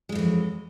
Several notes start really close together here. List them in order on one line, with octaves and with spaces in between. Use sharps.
G#3 F2 E3 F#3